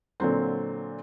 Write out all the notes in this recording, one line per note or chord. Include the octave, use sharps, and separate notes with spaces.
A#2 D3 F#3 C4